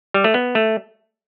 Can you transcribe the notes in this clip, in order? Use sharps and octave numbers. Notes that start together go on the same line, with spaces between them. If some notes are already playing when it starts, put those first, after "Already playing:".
G3
A3
B3
A3